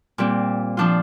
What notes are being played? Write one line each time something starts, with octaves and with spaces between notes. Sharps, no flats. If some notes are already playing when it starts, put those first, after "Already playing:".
A#2 G3 C4
F3 D4 F4